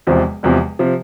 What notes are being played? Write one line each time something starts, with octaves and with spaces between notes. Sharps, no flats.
E1 E2 C3 F3
E1 E2 C3 F3
C3 F3